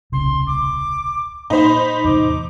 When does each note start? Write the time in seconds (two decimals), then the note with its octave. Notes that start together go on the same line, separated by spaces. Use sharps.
0.12 D#1 C2 C#3 C6
0.46 D6
1.50 A#2 D#4 C5 B5
2.04 E2 A2 C3 D6